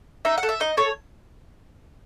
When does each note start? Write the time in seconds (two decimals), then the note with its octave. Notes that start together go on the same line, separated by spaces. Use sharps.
0.25 D#4 E5
0.38 F#5
0.43 A4
0.49 E5
0.60 D#4 D#5
0.77 A4 C#5